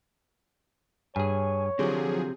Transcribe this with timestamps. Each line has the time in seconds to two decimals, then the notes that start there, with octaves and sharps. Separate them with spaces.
1.16 G2 G#4 C#5 G#5
1.79 D3 F3 F#3 C4 G4 G#4